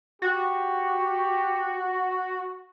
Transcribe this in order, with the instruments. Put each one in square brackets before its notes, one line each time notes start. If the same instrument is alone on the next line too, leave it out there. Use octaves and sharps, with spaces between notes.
[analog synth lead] F#4 [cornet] G4